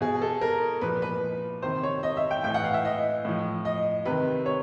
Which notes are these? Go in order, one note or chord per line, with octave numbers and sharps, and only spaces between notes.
B2 G#4
A4
A#4
A#2 F3 B4
B4
C3 D#3 C5
C#5
D#5
E5
G5
A2 E3 G5
F#5
F5
E5
D#5
A2 F3
D#5
C3 D#3 B4
C#5